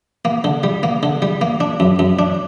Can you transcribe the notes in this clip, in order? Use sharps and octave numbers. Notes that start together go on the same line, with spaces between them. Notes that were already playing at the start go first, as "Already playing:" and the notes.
A#3
D3
G3
A#3
D3
G3
A#3
D4
F#2
F#2
D4